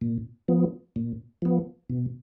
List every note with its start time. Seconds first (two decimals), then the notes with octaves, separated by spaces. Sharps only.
0.01 A#2
0.48 F3 B3
0.96 A#2
1.42 F3 B3
1.90 B2